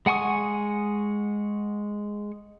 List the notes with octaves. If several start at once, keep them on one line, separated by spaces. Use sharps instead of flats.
G#3 F#5 G#5 C#6 D#6